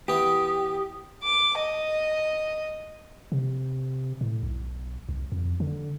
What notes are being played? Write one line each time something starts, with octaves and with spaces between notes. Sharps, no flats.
E3 B3 G4 D#6
D6
D#5
C3
A2
B1
C2
F2
D3